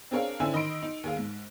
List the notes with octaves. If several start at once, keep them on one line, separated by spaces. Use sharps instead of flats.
C4 D4 G#4 A#4 C#5 F5
D3 C4 C#4 E4 G#5 E6
D#3 D#5 B5 C6 D7
D#4
D#2 G#4 F5
G#2